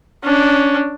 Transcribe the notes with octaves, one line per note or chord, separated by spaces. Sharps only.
C#4 D4